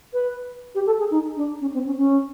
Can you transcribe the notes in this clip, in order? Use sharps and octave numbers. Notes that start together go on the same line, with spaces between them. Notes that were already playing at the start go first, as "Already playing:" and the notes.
B4
G4
A4
G#4
D#4
D4
C#4
C4
C#4
C#4